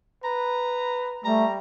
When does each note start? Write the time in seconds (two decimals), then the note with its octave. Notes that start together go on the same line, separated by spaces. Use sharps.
0.24 B4 A#5
1.25 G3 A3 A#5